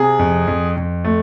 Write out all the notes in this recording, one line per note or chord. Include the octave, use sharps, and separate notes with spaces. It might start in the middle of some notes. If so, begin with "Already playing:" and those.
Already playing: C3 G#4
F2
F2
F2
A3